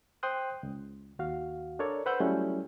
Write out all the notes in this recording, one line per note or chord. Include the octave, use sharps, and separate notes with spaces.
C5 G5 C6 D#6 F#6
C#2
D#2 F#4 F5
D4 A4 A#4 C#5 D5
B4 C5 F#5 E6 F#6 G6
F#3 G3 A3 C#4 E4